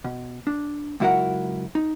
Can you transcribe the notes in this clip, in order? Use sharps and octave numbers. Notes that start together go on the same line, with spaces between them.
B2
D4
C#2 F#2 E4 F#4 A#4 F#5
D#4